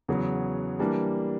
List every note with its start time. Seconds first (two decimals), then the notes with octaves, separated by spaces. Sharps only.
0.08 E2 C#3 F#3
0.79 E3 G3 A#3 D4